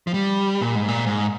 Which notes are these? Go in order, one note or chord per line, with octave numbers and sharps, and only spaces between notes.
F3
G3
A#2
G#2
A#2
G#2